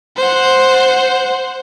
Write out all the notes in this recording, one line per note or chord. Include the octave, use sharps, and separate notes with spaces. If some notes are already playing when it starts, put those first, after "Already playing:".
C5 F#5